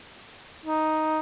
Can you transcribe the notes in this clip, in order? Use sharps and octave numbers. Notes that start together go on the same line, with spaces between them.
D#4